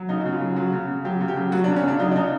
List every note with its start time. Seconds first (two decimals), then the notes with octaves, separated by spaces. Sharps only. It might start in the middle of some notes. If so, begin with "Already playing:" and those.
Already playing: F#3
0.09 C#3 D#4
0.21 C#3 F#4
0.32 F4
0.41 F#3
0.56 F#3 F#4
0.73 C#3
0.88 C#3
1.05 F#3 G4
1.21 C#3
1.28 G4
1.37 F#3
1.52 F#3 F#4
1.64 D4
1.68 C#3
1.76 C#4
1.84 C#3 D4
1.99 F#3 D#4
2.11 D4
2.16 C#3 D#4